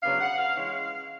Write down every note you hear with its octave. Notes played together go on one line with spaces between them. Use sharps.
C#3 F#3 B3 D4 F5
F#5
F5
E3 G#3 C#4 E4 F5